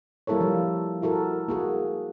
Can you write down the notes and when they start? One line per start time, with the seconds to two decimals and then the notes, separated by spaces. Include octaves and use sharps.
0.27 G3 A#3 E4 A4 A#4 C#5
0.41 F3 F4
1.02 E4 F#4 A4 A#4
1.48 A#3 F#4 G#4